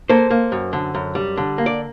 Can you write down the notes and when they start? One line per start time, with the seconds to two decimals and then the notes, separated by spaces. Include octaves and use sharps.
0.09 A#3 A4 C5
0.30 A#3
0.52 F#2
0.73 D3
0.95 F#2
1.15 G3
1.37 D3
1.58 A#3
1.66 D5